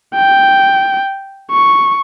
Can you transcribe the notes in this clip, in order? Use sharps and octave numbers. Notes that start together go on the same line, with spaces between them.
G5
C#6